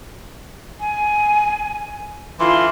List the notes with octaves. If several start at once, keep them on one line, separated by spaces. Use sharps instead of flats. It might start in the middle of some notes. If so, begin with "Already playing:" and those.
G#5
D3 E3 F4 C6